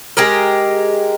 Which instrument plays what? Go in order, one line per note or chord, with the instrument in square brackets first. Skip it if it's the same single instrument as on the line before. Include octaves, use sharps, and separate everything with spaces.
[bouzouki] G#3 G4 G#4 A#4